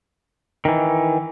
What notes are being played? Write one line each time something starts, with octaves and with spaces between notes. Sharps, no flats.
D#3 E3